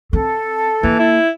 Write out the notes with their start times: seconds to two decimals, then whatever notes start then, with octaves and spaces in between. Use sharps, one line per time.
0.13 C4 A4
0.83 E3 A#3
0.99 E4